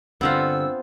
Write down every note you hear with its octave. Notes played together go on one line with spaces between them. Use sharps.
G2 D3 B3 C4 F4 E6